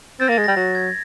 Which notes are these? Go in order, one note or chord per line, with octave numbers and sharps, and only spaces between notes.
C4 A6
A#3 A#6
A6
G#3
A#6
G3
F#3 A#6
G#6